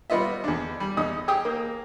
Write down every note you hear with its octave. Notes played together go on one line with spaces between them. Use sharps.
G3 B3 F4 D#5 E5
E2 D4
G3
E2 D#4 D#6
G4 G#4 G5 D#6
A#3